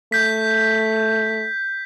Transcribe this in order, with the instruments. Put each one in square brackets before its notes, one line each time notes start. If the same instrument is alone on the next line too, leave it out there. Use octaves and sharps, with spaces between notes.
[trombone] A3 [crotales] G6 B6